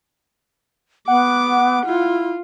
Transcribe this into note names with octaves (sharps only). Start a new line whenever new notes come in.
B3 F#5 D6
E4 F4